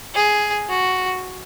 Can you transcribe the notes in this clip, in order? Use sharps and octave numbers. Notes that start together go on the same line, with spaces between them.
G#4
F#4